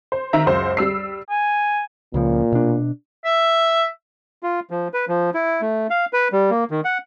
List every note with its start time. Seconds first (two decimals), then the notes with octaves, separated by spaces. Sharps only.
0.12 C5
0.33 D#3 E5 A#5
0.46 C#2 F#2 C5
0.77 G3 E6 C7
1.30 G#5
2.14 C#2 A#2 C#3 F3
2.52 B2 D4
3.25 E5
4.43 F4
4.70 F3
4.94 B4
5.08 F3
5.34 E4
5.61 A3
5.90 F5
6.13 B4
6.32 G3
6.50 A#3
6.71 D#3
6.85 F#5